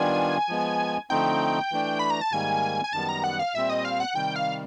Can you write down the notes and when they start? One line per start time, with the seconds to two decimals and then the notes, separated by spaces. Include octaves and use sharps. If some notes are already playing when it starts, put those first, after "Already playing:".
Already playing: D#3 G3 B3 D4 F4 G#5
0.49 F3 G#3 B3
1.10 D3 F3 A3 C4 D#4 G5
1.72 E3 A3 D4
1.99 B5
2.10 A#5
2.21 A5
2.32 G#2 D#3 G3 A#3 G#5
2.84 G#5
2.93 F#2 D#3 G3 B3 A5
3.09 A#5
3.24 F#5
3.39 F5
3.55 A#2 G3 C4 E5
3.70 D#5
3.85 F5
4.00 F#5
4.15 C3 D#3 G3 G5
4.36 F5